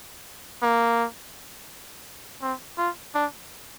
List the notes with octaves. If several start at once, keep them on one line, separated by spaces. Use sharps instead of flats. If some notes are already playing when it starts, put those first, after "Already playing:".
A#3
C4
F4
D4